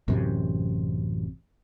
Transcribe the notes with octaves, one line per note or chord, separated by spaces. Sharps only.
A1 F#2 C3